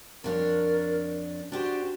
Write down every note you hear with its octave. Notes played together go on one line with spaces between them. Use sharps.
F2 D4 A#4 C#5
D4 F#4 G4 C5